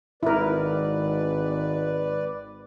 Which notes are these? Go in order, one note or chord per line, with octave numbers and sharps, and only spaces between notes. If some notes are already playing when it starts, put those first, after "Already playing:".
G#1 E4 A#4 B4 D5